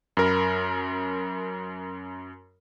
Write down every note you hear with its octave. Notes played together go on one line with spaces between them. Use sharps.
F#2 A#4 B5